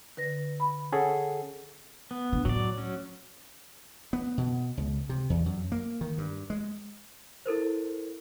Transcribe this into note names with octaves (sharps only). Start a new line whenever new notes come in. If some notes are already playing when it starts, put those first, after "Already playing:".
D3 B4 A#6
B5
C#4 G#4 A4 F#5
B3
D3
A2 F#3 D5
F#3 C#4
B3
B2
C#2
C3
E2
F#2
A#3
D#3
G2
G#3
E4 A4 A#4 C5